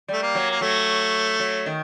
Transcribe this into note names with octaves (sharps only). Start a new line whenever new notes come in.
G3 A3
A#3
F#3
A#3
F#3 A3
F#3
D#3